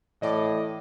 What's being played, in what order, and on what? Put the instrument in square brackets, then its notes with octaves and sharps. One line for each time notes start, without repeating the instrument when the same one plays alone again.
[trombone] A2 [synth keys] E3 D5 D6 [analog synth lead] D#5